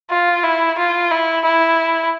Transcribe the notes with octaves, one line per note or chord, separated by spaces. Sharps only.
F4
E4
F4
E4
E4